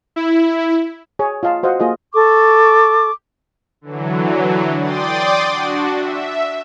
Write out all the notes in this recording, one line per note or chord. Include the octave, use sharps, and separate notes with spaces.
E4
G#4 C#5
F4 D#5 F5 A5
F#4 C5 D#5 F5 F#5
A#3 F4 G#4 A4 D#5
A4 C#6 D6
D3 E3 F#3
D5 G5 C6 D6 D#6 A6
D4 F#4
E5